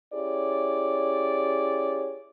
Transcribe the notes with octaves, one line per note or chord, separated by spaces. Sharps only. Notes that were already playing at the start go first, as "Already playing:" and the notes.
C#4 E4 G4 G#4 C#5 D5